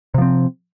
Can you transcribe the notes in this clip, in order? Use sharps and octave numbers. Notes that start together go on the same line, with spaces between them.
C3 F3 C4